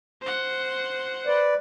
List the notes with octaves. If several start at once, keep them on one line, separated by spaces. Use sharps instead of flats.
C5 F#5
B4 D5